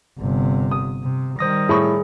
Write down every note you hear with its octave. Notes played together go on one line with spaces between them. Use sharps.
G1 C3
D#6
C3
D#3 G3 C5 D#6 A#6
A2 G#4 B5 C#6